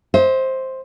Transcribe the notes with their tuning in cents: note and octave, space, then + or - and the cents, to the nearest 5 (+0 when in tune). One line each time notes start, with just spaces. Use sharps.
C5 +5 E5 -45